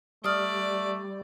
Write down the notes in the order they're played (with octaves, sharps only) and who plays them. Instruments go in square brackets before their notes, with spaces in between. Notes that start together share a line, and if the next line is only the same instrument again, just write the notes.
[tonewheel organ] G3 [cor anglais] A3 [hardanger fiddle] D5 [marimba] D#6 F6